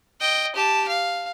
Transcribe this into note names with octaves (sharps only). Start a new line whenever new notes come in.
D#5 G5
G4 A5
F5